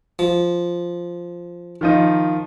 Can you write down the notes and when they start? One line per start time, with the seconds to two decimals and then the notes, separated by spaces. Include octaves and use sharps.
0.19 F3
1.81 D#3 F3 D#4